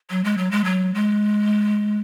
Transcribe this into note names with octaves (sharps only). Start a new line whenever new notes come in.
F#3
G#3
F#3
G#3
F#3
G#3